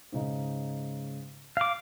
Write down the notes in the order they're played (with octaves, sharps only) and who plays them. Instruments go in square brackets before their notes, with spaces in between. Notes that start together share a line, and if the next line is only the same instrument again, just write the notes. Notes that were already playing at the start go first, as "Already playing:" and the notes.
[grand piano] G#2 C#3 D#4
[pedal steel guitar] F5 D6